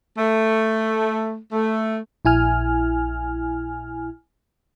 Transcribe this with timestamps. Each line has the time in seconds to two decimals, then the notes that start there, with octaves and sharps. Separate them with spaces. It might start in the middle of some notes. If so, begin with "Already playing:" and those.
0.17 A3
1.52 A3
2.25 A#1 E4 G#5 F6